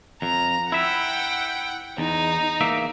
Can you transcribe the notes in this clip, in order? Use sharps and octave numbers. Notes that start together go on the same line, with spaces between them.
F2 A#5
E4 E5 F#5 G5
E2 D#4
E2 A#3 E5